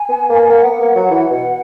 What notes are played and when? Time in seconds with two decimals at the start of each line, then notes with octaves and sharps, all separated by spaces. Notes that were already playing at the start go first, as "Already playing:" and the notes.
Already playing: G#5
0.09 B3
0.30 A#3
0.49 A#3 F#5
0.65 B3
0.80 A#3
0.95 F#3
1.10 E3
1.31 B2